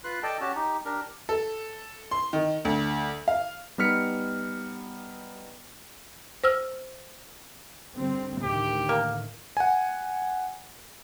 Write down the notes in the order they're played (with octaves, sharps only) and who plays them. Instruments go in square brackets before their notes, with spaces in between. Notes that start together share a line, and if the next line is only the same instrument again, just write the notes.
[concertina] F4 B4 C6 F#6
A4 D5 D#5 G5 A5
C#4 F#4 G4 A5
D#4 G4
D4 G4 A#4
[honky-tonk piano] A4
C6
D#3
D2
F5
[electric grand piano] G3 B3 D#4 F6 B6 C#7
[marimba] C5 E6 F6
[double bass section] D3 G3 C4
[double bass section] D2 A2 D#3 [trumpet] G4
[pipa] A#3
[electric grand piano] F#5 G#5